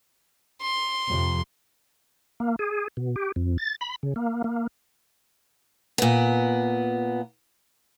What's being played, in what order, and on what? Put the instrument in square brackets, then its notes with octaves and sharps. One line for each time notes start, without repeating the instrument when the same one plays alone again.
[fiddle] C6
[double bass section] F2 C3
[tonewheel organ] A#3
G#4
B2
G4
F2
A6
B5
C#3
A#3
A#3
[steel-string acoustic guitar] A#2 B3